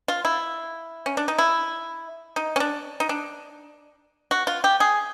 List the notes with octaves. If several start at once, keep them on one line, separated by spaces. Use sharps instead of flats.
F4
E4
C#4
D4
D#4
E4
D#4
C#4
D4
D#4
D4
F#4
F4
G4
G#4